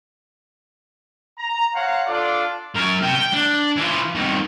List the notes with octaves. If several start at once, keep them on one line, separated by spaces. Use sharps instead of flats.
A#5
C5 C#5 F5 F#5 A#5
D4 F4 A4 D5
F#2 A#4
C3 G5
G5
D4
E3 F4
C2 D#3